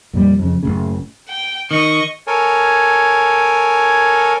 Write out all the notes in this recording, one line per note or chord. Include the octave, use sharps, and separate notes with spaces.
F2 A#2 G3
F2 C#3
F#1 C2 A2 C#3
G5
D#3 D#5 C#6
A4 A#4 C#5 G#5